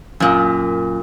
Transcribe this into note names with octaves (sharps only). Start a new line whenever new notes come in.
F#2 A#2